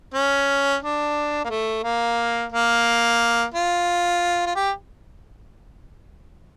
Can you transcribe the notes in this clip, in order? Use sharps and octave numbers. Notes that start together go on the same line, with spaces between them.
C#4
D4
A#3
A3
A#3
A#3
F4
F4
G4